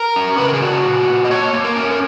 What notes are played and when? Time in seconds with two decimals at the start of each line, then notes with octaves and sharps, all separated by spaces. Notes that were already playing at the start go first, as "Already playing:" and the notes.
Already playing: A#4
0.16 C#4
0.38 C#3 B4
0.46 A#4
0.54 G#4
0.61 F#3 F#4
0.84 A#2
1.07 A#2
1.25 D#5
1.30 A#3 C#5
1.53 A#3
1.65 A#4
1.76 C#4
1.91 A#4